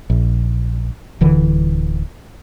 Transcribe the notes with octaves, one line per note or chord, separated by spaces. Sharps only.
A#1
D1 D3 E3